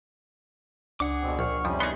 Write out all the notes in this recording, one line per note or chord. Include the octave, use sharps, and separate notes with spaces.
C#2 D4 G#4 D5 F#5 D6
F2 B2 C4
A#1 C#6 F6
F2 C3 F3 G3 C#4
B3 D#4 G#4 C6